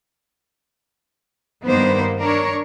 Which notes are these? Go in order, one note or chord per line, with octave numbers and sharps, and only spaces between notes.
G2 D#3 G3 A#3 B3 C5
D4 A#4 C#5